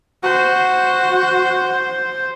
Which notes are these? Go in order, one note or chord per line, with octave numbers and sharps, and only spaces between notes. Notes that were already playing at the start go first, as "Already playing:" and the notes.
F#4 C5